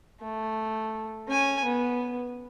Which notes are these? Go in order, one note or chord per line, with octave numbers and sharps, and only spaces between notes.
A3
C#4 G#5
B3